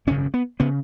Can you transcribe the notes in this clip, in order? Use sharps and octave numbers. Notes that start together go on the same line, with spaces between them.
G#1 F#2 C#3 C#4
B3
C#3 B3